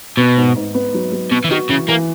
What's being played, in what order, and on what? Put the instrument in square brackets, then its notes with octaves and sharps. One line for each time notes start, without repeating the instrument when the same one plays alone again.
[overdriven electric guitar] B2 [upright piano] B3
[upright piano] G#2
G#2
B3
F#3
F#3
[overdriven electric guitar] B2 [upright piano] B3
[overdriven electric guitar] E3
[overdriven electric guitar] D#3 [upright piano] F#4
[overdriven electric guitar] C#3 [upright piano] E3
[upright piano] E3 [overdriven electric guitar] A#3